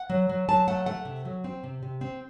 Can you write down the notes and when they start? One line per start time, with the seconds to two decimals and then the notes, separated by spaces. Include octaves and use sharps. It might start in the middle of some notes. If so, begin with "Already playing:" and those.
Already playing: F#5
0.10 F#3
0.29 F#3
0.48 F#3 A5
0.68 A3 F#5
0.86 A3 F#5
1.05 C3
1.25 F#3
1.44 C4
1.64 C3
1.83 C3
2.01 C4